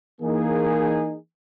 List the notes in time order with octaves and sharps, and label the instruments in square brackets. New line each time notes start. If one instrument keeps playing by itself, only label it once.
[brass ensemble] E3 A#3 D#4 G#4